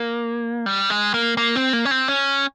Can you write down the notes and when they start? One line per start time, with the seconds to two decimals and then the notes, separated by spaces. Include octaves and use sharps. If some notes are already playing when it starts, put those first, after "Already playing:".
Already playing: A#3
0.66 G3
0.90 G#3
1.14 A#3
1.37 A#3
1.56 C4
1.73 A#3
1.85 C#4
1.91 C4
2.08 C#4